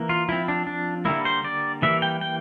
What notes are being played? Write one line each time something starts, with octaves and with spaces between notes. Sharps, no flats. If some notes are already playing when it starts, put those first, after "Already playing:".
Already playing: E3 A#3
F4
F3 C4 E4
D4
D4
D3 G3 A#3 E4
C5
D5
E3 G3 A#3 E5
G5
G5